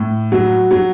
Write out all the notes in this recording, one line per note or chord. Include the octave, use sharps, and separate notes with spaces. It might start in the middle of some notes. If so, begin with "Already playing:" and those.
Already playing: A2
F#3
F#3